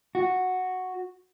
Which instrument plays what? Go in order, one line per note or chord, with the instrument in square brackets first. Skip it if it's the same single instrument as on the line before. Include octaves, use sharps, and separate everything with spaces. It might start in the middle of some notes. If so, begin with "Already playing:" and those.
[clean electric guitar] F#4